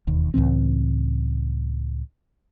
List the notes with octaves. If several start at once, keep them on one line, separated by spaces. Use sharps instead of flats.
E1 D#2
C#2 A2 E3 C4